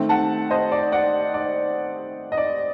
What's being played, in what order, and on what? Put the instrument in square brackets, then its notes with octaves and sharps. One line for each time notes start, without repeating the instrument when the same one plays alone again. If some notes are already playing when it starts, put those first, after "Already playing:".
Already playing: [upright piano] D#3 A3 C4 D#4
F#5 A5
C5 D#5
D5
D5 F#5
D5
D#5
D5